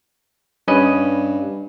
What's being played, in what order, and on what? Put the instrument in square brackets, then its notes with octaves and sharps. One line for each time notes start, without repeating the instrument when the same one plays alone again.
[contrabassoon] G2 [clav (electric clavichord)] C#4 B4 D#5